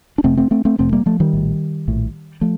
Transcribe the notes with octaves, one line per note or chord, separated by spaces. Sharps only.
D4
F1 F2 C3 A3 C4
A3 C4
A3 C4
A3 C4
F1 F2 C3 A3 C4
G3 A#3
F3 A3
D#3 G3
A#1 A2
A#1 A2
F3 A3